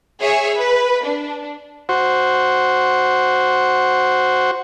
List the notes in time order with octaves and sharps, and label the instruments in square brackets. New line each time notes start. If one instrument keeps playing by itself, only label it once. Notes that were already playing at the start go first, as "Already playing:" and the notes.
[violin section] G#4 C#5 E5
B4
D4
[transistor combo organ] F#4 C5